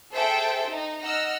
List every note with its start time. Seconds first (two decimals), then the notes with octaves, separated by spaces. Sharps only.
0.13 G#4 A4 C5 E5 G5
0.68 D#4
1.02 D#5 F#5 E6 F6